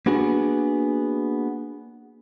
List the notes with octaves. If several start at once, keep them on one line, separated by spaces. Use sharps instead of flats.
A#3 B3 D4 F#4 G#4